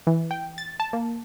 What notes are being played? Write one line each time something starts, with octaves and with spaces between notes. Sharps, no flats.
E3
G5
A6
A5
A#3